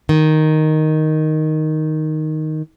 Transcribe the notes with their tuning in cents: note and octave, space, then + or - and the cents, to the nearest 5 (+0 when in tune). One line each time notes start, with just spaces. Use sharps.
D#3 +0